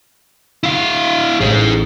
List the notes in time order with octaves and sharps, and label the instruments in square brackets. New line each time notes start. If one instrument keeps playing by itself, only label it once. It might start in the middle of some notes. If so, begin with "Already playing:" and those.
[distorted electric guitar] E4 F5
[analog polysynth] A1 [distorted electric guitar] G#4 C5